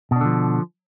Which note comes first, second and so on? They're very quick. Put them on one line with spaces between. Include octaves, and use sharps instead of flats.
B2 D4 D3 F3